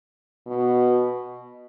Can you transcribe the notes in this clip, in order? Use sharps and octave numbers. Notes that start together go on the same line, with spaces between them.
B2